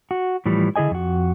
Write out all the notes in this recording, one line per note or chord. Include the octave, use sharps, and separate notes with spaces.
F#4
A2 E3 F3 G3
D3 E4 G#4 D#5 G#5
F2 F#4